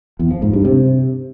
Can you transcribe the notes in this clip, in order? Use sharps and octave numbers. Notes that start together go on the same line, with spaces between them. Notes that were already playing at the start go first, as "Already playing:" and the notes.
E2
F3
G#2
G2
C3